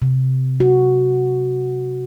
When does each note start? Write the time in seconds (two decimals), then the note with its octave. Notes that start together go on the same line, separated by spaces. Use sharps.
0.02 C3
0.60 F#4